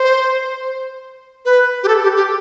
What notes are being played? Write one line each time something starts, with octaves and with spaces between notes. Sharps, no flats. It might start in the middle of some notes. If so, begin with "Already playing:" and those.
Already playing: C5
B4
G4
A4
G4
G4